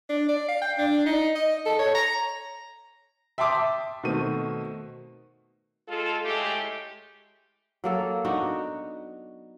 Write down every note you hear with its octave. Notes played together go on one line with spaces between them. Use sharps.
D4
D5
F5
G5
D4
D#4
D#5
A4
C#5
A#5
E5 G5 A5 C6 D6 D#6
B2 D#3 A3 C4 D#7
G#3 F4 A4
A2 G#3 A3 G4
F#3 A#3 A4
B3 D4 D#4 F#4